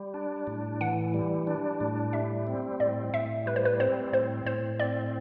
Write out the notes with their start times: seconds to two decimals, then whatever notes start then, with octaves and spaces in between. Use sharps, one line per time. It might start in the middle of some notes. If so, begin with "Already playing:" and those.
Already playing: G3
0.14 D4
0.47 A2
0.81 E3 F#5
1.14 G3
1.47 D4
1.81 A2
2.13 G3 E5
2.47 C4
2.80 A2 D5
3.14 A2 E5
3.46 G3 B4
3.56 C5
3.65 B4
3.80 C4 C5
4.13 A2 C5
4.46 A2 C5
4.80 C4 D5